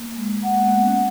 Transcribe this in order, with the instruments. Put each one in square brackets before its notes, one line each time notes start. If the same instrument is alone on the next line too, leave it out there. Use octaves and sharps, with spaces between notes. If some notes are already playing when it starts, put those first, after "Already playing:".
Already playing: [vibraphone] A#3
G#3
[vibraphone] A#3 [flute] F#5
[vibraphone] B3
C#4